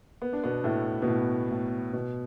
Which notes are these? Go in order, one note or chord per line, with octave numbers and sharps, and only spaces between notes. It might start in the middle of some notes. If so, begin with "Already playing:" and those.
B3
D4
B2 B3
A2 A3
B2
A2
A2
B2